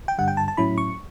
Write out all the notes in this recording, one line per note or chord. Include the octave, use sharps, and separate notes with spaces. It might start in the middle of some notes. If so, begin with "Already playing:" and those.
G5
G2 D3 G3 F#5
G5
A5
A5
A2 F#3 C#4 E4 B5
C#6